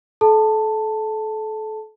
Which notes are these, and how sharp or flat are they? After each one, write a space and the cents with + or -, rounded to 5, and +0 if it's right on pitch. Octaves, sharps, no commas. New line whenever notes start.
A4 -30 A5 +10